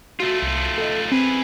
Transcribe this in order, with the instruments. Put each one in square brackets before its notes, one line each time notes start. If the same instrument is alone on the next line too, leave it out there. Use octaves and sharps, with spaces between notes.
[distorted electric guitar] A3 F4 [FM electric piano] F#4
[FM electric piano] C2 C#7
A4 D#5
[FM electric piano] C4 [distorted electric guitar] G#4 B4